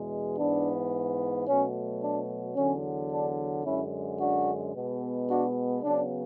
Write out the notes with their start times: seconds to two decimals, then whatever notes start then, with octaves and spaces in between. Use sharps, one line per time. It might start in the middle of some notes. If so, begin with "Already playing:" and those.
Already playing: E2 B2 G#3
0.38 G#2 E3 B3 D4
1.47 B2 F#3 A3 C#4
2.02 D4
2.56 E2 D3 F#3 C#4
3.11 D4
3.65 F#2 D3 G#3 C#4 E4
4.20 D4 F#4
4.74 B2 G#3 B3
5.29 D4 F#4
5.83 C#3 F#3 B3 D4